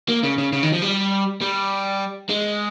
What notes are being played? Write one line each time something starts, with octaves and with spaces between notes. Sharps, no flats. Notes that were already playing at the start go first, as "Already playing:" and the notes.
A#3
C#3
C#3
C#3
D#3
F3
G3
G3
G#3